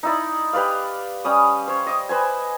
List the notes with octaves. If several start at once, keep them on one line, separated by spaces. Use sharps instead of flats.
D#4 E4 D5
G4 B4 D5 F5
G3 C#4 D#6
C5 C#5
D#5 D6
B4 C5 G#5